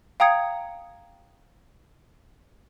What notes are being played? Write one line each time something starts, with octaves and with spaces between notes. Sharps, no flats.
F5 G5 A#5 D#6 G#6 C#7